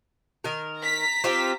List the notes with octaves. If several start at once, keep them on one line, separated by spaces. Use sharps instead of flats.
D#3 A#4
A#5 B6
C4 F4 G4